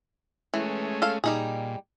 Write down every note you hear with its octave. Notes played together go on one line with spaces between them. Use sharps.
E3 G#3 A3 C#4
A4 F5
A#2 G3 D#4 G#4